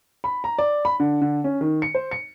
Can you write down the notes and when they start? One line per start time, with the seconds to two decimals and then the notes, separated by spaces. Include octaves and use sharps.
0.24 B5
0.44 A#5
0.59 D5
0.85 B5
1.00 D3
1.22 D3
1.44 C#4
1.61 D#3
1.82 C#7
1.95 C5
2.11 C#7